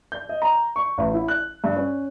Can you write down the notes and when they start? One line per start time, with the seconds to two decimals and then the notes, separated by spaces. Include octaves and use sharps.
0.12 G6
0.29 D#5
0.42 A#5
0.76 C#6
0.98 A1
1.14 E4
1.28 F#6
1.64 G2
1.76 C#4